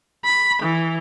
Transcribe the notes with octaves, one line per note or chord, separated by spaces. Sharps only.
B5
E3